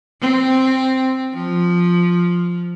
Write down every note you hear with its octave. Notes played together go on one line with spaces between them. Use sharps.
C4
F3